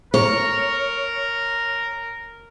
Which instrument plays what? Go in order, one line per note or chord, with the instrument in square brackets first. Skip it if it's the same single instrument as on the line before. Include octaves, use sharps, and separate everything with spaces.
[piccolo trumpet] A#4 [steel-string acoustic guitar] C#5